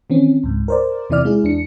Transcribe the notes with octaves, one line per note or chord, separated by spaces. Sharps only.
D#3 E3 C4 C#4
C#2 G#2
A#4 C5 D5
E2 C3 E3 E4 D5 F6
G#3 E4 G#4
E2 D4 C#7